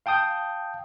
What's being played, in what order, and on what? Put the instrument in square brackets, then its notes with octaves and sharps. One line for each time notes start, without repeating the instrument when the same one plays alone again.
[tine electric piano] F5 G5 A5 D#6 G6